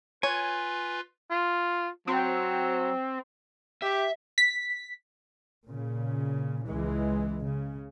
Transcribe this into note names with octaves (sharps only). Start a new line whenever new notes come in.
F4 B4 C#5 G#5
F4
F#3 C4
G4 E5
B6
A#2 C#3
C#2 E3 G#3
C#3